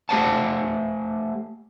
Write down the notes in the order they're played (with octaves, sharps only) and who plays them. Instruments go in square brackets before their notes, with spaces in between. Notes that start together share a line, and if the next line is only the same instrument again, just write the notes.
[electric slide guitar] A3 G4 C5 F#5 A5